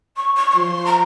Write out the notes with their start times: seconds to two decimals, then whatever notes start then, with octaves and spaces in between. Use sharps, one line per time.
0.16 C#6
0.36 C#6
0.50 C#6
0.56 F3 C6
0.85 A#5